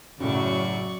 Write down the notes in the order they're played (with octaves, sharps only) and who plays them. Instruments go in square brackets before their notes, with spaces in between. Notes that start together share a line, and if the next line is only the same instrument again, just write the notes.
[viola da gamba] F#2 F#3 [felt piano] A2 C#3 [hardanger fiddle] D5 C#6